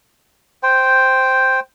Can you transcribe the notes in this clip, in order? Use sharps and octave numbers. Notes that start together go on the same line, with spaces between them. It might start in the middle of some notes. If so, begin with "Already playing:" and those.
C5 G5